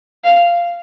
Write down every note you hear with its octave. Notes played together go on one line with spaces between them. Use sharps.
F5